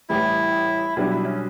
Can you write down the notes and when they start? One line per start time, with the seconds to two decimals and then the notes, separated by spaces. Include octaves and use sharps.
0.10 A1 A2 E3 G3 E4
0.96 B1 B2 G3 D4 E4
1.11 E4
1.26 C#4